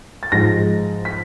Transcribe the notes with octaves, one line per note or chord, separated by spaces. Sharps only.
A6
G#2 F3 G#3 A#6
B6